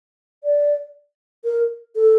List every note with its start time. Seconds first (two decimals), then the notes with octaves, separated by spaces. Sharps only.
0.44 D5
1.44 A#4
1.95 A4